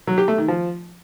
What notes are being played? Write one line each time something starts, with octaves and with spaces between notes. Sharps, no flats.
F#3
G4
A3
D#3
F3